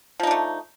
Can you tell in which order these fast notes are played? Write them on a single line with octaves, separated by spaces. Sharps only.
F3 D#4 D4 A3